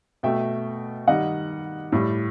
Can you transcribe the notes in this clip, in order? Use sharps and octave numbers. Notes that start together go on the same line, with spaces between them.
B2 A3 E5 G5
D#3 G3 D#5 F#5
A2 G3